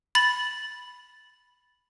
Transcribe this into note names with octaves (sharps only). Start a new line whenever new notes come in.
B5 A6 F#7